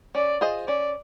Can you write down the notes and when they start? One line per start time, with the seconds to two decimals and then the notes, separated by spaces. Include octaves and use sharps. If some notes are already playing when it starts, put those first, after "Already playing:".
0.15 C#4 D5
0.41 F4 G#4 C5 D#5
0.67 C#4 D5